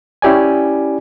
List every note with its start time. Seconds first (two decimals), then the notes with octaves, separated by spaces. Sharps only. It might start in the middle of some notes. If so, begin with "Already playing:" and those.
0.22 C#4 E4 G4 D5 G#5